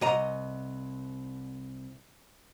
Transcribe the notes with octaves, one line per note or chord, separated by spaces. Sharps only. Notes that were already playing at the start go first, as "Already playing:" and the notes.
C2 D#5 A#5